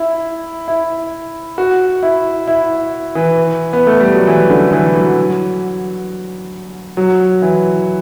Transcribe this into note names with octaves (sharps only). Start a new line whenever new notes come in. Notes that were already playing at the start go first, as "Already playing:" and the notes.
Already playing: E4
E4
F#4
E4
E4
E3
B3
A3
G3
F#3
E3
D3
E3
F#3
F#3
E3